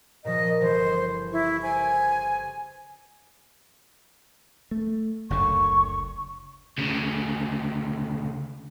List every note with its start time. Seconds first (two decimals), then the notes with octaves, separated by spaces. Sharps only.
0.25 A#2 C#3 F3 D#5
0.61 G1 E3 C5
1.33 E4 C#6
1.63 C5 G#5 D6 D7
4.71 A3
5.30 F#1 D2 D3 C#6
6.78 D2 C#3